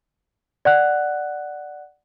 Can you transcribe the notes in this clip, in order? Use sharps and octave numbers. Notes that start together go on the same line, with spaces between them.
D5 F#5 F#6